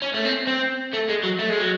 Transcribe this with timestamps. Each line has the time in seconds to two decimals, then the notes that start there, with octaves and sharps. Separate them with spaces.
0.02 C#4
0.14 A3
0.25 C4
0.47 C4
0.93 A3
1.09 G#3
1.23 F#3
1.39 A3
1.49 G#3
1.60 F#3